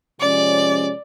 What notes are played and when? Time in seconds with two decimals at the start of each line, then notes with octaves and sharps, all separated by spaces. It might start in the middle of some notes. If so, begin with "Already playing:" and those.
0.20 C3 F3 G#3 C#4 D5